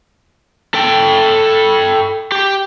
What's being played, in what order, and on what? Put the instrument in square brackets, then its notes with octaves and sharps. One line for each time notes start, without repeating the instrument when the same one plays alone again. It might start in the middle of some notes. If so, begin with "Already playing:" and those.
[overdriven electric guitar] A4 G5
G4